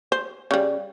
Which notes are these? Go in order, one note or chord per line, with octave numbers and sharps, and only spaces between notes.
C5
C#3 G3